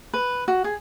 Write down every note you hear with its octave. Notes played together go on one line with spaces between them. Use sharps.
B4
F#4
G#4